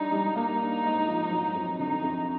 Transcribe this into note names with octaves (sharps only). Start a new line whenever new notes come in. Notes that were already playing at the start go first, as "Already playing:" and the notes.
Already playing: G3 D4 D#4
G3
A#3 D#4
D4
G#2
F3
F#3
F2
D3 D#4
F2